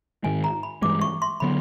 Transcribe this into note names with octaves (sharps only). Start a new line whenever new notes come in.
G#2 D#3 G#3 G#5
A#5
B5
G2 E3 G#3 D6
C#6
C6
D3 F#3 B3 B5